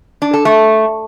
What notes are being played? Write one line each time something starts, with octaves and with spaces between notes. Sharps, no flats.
D4
A4
A3